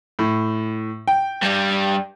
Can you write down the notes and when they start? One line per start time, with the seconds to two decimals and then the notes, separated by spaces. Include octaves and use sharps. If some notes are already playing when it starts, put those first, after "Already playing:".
0.19 A2
1.08 G5
1.43 G2 G3